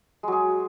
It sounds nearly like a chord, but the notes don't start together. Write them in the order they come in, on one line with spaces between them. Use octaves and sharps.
G#3 F#3 G#4